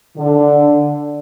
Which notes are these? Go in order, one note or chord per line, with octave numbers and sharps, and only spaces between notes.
D3